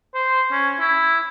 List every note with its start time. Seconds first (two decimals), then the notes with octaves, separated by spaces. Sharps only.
0.14 C5
0.51 C#4
0.80 E4